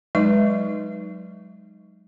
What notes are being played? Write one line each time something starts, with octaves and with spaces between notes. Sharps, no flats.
F#3 G#3 D#4 B4 D#5